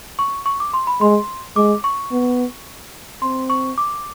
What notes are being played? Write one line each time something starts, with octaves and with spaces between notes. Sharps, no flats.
C#6
C#6
D6
C6
B5
G#3 C6
G#3 D6
C#6
B3
C4 C6
C#6
D6